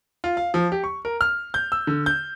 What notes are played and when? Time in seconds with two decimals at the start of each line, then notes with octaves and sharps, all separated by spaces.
0.24 F4
0.37 F5
0.54 F3
0.72 G4
0.84 C#6
1.05 A#4
1.21 F6
1.54 G6
1.72 E6
1.87 D3
2.06 G6